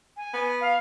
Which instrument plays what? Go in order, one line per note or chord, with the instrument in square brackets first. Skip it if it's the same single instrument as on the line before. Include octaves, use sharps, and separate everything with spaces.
[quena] G#5
[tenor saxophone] B3
[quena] F5